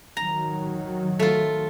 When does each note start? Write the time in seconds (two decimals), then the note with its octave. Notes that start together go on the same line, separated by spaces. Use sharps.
0.17 D#3 F#3 A#5
1.19 A3 F4